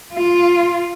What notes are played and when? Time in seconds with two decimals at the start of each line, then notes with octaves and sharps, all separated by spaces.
0.13 F4